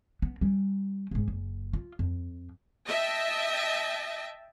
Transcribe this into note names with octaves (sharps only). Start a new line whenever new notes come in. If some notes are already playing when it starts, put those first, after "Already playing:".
B3
G3 C#4
E1 G#2
F#1
F4
F2
D#5 E5 G5 A5